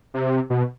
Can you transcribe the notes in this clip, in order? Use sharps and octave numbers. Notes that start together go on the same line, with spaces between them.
C3
B2